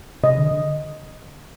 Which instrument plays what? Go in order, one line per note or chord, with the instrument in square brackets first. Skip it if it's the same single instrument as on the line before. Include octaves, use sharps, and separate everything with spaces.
[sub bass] C3 [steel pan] D#5
[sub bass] D3
D3